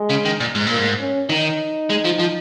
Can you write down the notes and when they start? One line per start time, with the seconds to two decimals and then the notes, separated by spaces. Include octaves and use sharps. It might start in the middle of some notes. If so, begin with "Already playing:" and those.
Already playing: G#3
0.10 C#3
0.26 D#3
0.40 A#2
0.55 G#2
0.67 A#2 A#3
0.77 G#2
1.00 C#4
1.29 D#3 D#4
1.90 G#3
2.04 F3
2.19 F3